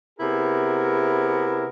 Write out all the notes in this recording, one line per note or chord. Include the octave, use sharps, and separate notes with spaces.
C3 B3 E4 G#4 A#4